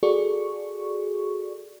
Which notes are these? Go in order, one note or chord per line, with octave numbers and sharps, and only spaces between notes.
F#4 G#4 A4 D5 C#6